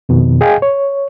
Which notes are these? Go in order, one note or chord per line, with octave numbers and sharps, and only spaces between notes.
F2 B2 D#3
G#4 D#5 F5 G5 G#5
C#5